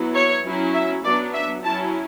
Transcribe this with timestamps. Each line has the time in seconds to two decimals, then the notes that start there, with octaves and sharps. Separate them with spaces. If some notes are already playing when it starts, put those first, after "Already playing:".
Already playing: F#3 B3 E4
0.15 C#5
0.45 F#3 C#4 E4
0.74 E5
1.04 F#3 B3 D4 D5
1.33 E5
1.63 F#3 C#4 E4 A5